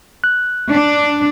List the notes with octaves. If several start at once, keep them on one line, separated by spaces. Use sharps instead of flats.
F#6
D4